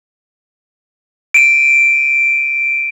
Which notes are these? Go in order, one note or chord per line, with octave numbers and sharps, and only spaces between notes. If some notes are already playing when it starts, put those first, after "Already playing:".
D7 D#7